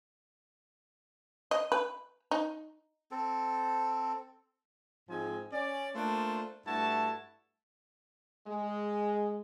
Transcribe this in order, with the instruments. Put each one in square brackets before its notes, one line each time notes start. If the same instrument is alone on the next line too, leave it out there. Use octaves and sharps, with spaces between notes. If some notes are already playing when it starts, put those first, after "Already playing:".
[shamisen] D#5
B4
D#4
[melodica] C4 A4
[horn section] G#2 F3 G#3 C4 G#5
C#4 D5
A3 A#3 D4 F4 C5
G2 A3 E4 F#4 A5
[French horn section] G#3